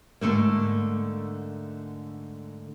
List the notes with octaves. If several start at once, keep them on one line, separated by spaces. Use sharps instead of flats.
G#2 D3 A3 A#3